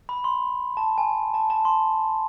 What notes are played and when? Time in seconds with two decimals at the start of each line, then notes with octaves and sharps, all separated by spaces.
0.09 B5
0.24 C6
0.77 A5
0.98 G#5
1.34 A5
1.50 A5
1.65 C6